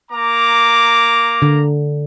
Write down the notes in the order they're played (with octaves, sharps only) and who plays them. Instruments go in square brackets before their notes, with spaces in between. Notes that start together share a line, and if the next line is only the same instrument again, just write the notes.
[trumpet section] A#3 A#5 D6
[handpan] D3